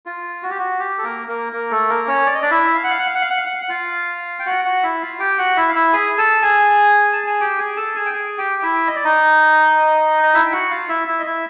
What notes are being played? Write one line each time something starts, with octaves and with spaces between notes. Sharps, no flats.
F4
F#4
G4
F#4
G4
A4
A#3 A#4
A#3 A#4
A#3 A#4
A3 A4
A#3 A#4
C#4 C#5
D5
D#5
D4 D5
E4 E5
F5
F#5
F5
F#5
F5
F#5
F5
F#5
F5
F#5
F5
F#5
F4 F5
G5
F#4 F#5
F#4 F#5
E4 E5
F4 F5
G4 G5
F#4 F#5
E4 E5
F5
E4 E5
G#4 G#5
A4 A5
G#4 G#5
A5
G#5
G4 G5
G#4 G#5
A4 A5
G#4 G#5
G5
G#4 G#5
G4 G5
E4 E5
D#5
D5
D#4 D#5
D#5
E4 E5
G5
F#4 F#5
F4 F5
E4 E5
E4 E5
D#5
E4 E5